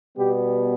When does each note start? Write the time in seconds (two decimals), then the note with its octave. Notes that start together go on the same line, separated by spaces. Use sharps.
0.17 B2 G3 B3 G4